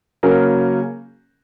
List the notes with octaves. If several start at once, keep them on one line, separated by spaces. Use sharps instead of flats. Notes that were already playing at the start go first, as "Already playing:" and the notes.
C#3 F#3 A#3 C#4 A#4